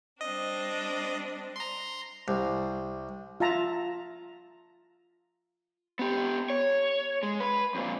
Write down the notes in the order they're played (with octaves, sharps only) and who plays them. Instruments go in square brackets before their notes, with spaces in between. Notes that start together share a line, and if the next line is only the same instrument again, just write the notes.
[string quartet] G3 C4 D4 [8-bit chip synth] D#5
[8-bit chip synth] A#5 C6
[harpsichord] C2
[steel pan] F4 E5 A5 A#5
[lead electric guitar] B3 G4
C#5
G#3
B4
F2 A#2